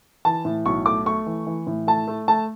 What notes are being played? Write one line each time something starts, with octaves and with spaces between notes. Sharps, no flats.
E3 A5
A2
B1 C#6
A3 D6
A3 C#6
E3
E3
A2
A3 A5
A3
A3 A5